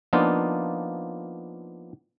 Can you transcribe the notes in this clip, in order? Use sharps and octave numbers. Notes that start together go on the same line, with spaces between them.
F3 A#3 B3 D4 D#4 F4